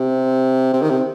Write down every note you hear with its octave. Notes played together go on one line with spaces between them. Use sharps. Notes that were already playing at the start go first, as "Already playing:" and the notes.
Already playing: C3
C3
D#3
C3